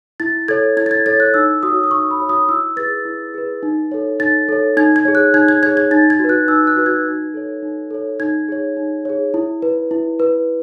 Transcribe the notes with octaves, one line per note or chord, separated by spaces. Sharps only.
E4 A6
A4 C#5 G#6
E4 G#6
A6
G#6
A4 C#5 A6
F#6
D#4 E6
F#4 C#5 D#6
D#6
D#4 C#6
B5
F#4 C#5
D#6
E4 E6
G#4 B4 A6
E4
G#4 B4
D#4
A4 C#5
D#4 A6
A4 C#5
D#4 G#6
G#6
G#4 C#5
F#6
D#4 G#6
G#6
G#4 C#5 G#6
G#6
D#4 A6
G#6
F#4 B4
F#6
D#4 E6
F#6
F#4 B4
G#6
D#4
A4 C#5
D#4
A4 C#5
D#4 G#6
G#4 C#5
D#4
G#4 C#5
E4
B4
E4
B4